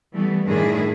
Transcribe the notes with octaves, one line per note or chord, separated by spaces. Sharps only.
E3 G3 A3 B3
A2 D#3 F3 D4 E4 G#4